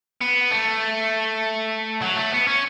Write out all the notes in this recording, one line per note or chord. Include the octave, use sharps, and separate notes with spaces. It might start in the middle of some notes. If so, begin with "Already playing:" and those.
B3
A3
F#3
A3
B3
C#4